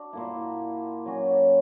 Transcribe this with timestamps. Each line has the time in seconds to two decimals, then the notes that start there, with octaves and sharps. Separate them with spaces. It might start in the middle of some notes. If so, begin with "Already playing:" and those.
Already playing: D4 F#4
0.13 A#2 A#3 E4
1.06 F#3 C#4 F#4